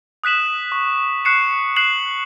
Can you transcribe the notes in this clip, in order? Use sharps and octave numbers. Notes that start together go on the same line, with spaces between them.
D#6 F#6 B6 E7 F#7
C#6
C#6 F#6 C7 C#7 E7
F#6 C7 E7 F#7